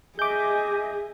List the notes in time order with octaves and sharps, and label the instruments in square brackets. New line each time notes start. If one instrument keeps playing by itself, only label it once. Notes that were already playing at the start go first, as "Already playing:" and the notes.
[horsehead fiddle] G#4 [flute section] D#5 E5 G#5 [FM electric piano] D6 G6